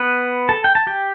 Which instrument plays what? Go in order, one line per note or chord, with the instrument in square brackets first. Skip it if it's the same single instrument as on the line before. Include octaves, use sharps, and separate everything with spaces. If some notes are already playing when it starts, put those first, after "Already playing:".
Already playing: [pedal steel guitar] B3 B4
A4 A5
G5
A5
G4 G5